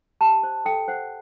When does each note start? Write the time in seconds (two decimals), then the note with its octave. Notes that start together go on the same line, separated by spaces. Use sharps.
0.21 G4 A5
0.43 C5
0.65 A4 G5
0.88 C5 F#5